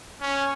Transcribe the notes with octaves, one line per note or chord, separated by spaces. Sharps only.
C#4